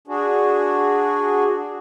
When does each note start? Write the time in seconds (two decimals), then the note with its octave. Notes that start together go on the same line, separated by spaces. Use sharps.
0.08 D4 F#4 G#4